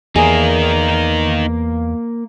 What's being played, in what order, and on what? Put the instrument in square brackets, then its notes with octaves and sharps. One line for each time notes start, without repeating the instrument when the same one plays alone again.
[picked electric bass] E2 [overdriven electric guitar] A#3 [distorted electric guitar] D#4 A#4 [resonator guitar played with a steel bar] G#4